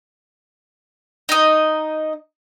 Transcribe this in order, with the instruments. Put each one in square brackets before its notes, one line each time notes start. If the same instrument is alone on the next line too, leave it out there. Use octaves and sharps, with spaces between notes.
[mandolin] D#4 D#5